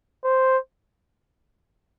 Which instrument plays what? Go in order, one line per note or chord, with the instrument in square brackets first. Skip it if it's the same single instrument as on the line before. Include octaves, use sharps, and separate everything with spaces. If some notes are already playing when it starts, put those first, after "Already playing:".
[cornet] C5